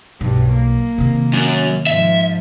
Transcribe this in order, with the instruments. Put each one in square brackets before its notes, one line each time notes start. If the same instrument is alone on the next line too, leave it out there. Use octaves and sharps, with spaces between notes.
[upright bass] B1 [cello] G2
[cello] A#3
[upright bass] C3 D#3
[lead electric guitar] F#2
[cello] G#2 F3 [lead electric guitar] E5